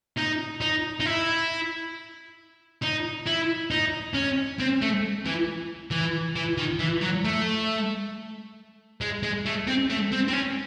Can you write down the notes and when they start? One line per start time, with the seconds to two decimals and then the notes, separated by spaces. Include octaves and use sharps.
0.18 D#4
0.61 D#4
1.00 D#4
1.06 E4
2.82 D#4
3.26 E4
3.71 D#4
4.15 C#4
4.59 C4
4.82 A3
5.26 E3
5.91 E3
6.36 E3
6.58 D#3
6.79 E3
7.01 F#3
7.25 A3
9.01 G#3
9.23 G#3
9.46 A3
9.67 C4
9.90 A3
10.12 C4
10.28 C4
10.33 C#4